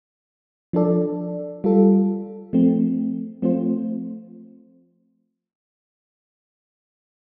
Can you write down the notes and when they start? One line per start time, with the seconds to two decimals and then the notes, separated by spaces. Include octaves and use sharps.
0.73 F3 D4 A4 D5
1.64 G3 F4 A4
2.53 F3 A3 C4
3.42 F3 A3 C4 F4 C5